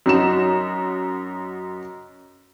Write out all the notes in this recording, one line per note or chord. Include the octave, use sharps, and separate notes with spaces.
F#2 D#4 F#4 E7